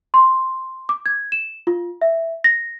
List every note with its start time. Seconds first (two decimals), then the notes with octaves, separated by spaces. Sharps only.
0.14 C6
0.89 D6
1.06 G#6
1.32 E7
1.67 F4
2.02 E5
2.44 A#6